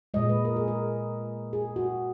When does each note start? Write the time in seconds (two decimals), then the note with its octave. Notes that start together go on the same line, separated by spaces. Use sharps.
0.14 A#2 G#3 D#5
0.29 B4
0.45 A#4
0.56 G#4
0.68 A#4
1.53 G#4
1.76 F#4